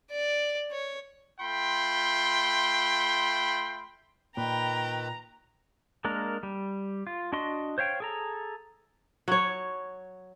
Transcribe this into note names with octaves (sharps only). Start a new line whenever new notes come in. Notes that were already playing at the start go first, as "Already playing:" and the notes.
D5
C#5
A3 F4 G5 B5 C6
A#2 D#3 B4 G5 A#5 B5
G#3 A#3 D4 A#4
G3
F4
D4 F#4 D#5 C6
C5 C#5 F5 G5
G#4 A4 A#5
F#3 C#5